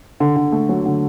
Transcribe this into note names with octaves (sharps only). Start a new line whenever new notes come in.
D3
D3
A3
F#3
D3